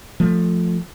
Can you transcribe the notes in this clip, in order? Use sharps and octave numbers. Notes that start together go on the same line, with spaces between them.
F3 A3